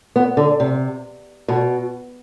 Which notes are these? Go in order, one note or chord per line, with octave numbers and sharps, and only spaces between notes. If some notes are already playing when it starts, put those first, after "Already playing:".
B3
D3
C3
B2